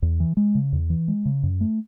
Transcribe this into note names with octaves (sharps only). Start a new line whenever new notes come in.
E2
E3
G#3
C#3
E2
E3
G#3
C#3
F#2
A3